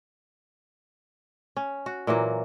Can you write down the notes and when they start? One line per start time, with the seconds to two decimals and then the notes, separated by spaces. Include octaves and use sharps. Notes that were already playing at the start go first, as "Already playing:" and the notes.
1.57 C#4
1.86 F#4
2.07 A#2 E3 F#3 A#3